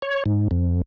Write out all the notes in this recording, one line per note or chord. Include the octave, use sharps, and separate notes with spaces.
C#5
G#2
F2